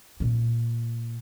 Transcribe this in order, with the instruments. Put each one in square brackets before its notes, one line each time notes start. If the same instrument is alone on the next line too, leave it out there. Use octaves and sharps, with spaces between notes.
[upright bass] A#2 A#3